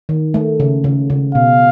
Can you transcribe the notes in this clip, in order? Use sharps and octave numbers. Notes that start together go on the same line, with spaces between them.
D#3
A3
C#3
C#3
C#3
B2 F5